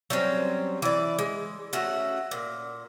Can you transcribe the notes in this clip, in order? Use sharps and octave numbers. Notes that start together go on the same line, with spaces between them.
F#3 G3 C4 C#4
E3 D5
G#3
A3 C#4 F#4 F#5
A#2